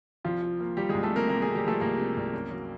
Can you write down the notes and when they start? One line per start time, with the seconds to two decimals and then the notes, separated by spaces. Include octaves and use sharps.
0.24 C2 F3 F4
0.42 F3
0.60 A#3
0.77 F3 G3 G4
0.89 G#3 G#4
0.94 C2
1.03 A3 A4
1.12 C3 A#3 A#4
1.29 C3 A#3 A#4
1.42 C3 G#3 G#4
1.55 G3 G4
1.64 F3 A3 A4
1.81 C2 A#3 A#4
1.98 C3
2.17 C2
2.34 F#2
2.51 F#3